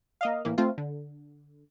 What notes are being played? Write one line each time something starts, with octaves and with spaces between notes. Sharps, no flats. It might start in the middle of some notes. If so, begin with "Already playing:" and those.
A#3 D#5 F5
A2 E3 A#3
A3 C4 F4
D3